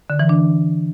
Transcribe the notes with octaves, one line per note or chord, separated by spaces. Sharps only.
D3
E3
D4